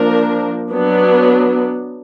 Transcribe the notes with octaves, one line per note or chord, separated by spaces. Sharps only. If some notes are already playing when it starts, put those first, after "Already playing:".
Already playing: F3 A#3 D4 A#4
F#3 B3 D4